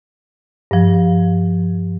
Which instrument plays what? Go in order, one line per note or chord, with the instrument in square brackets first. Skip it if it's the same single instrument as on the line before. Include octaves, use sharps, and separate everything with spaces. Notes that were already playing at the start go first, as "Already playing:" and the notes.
[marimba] G2 F3